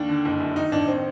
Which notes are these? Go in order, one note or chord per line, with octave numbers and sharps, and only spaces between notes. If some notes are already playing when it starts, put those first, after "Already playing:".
Already playing: D#2 D4
D3
F#1
F#2
D#3 D#4
A1 D4
D#3 C4